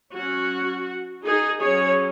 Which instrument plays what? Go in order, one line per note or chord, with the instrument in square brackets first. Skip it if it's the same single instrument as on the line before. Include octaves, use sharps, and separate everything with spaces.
[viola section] F#3 C#4 F#4
D#4 G#4
F#3 C#4 G#4 C#5